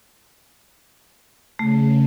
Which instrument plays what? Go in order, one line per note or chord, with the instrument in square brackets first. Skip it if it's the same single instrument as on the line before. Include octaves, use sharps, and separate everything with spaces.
[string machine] C#3 [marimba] A3